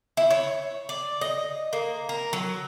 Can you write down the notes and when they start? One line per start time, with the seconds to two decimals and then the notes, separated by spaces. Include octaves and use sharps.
0.17 E4
0.31 C#5
0.89 D5
1.21 D#5
1.73 A#3
2.09 A#4
2.33 F#3